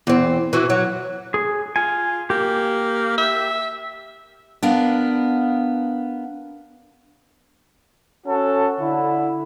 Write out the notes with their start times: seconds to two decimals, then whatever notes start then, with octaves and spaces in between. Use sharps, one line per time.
0.07 E2 C4
0.53 E3 F#4
0.70 F#3
1.34 G#4
1.76 F4 G#5
2.30 A#3 G4
3.18 E5
4.63 B3 D4 A#4 F5
8.25 C#4 F#4 A4
8.78 D3 E4